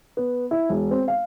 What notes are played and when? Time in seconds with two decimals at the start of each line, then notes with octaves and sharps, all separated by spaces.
0.17 B3
0.51 E4
0.69 E1
0.91 C4
1.08 F5